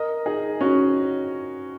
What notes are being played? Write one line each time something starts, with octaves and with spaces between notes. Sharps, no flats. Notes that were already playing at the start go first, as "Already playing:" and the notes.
Already playing: A#4 D#5
D#4 G#4
C#4 F#4